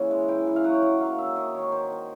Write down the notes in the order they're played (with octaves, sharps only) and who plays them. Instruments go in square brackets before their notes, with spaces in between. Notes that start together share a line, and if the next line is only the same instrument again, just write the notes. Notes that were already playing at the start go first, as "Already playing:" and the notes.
Already playing: [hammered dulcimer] C#3 E3 A#3 F#5
G#3
E3 G5
E3
F5
F#3 F#5
G5
F#3 F#5
A#3 F5
D#3 E5
D#3 D#5
D#3 C#5
D#3 C5
D#3